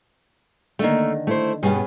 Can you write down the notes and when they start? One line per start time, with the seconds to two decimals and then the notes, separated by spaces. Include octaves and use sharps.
0.79 D3 D#3 A3 A#3
1.27 A3 E4 C5
1.63 G2 B2 B3 C#4 G#4